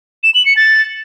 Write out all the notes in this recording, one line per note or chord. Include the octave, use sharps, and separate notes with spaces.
E7
F#7
C#7
A6